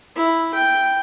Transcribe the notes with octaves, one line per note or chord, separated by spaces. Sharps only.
E4
G5